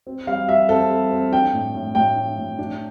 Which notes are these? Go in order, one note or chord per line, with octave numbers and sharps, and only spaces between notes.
C4
G3 F5
G3 E5
C4 A4
G3
C4
D4 G5
A2
A2
A2 G5
D4
A2
D4